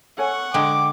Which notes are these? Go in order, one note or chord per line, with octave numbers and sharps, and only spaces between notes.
A4 C#5 F#5 G#5 C#6
D3 G#3 G5 D6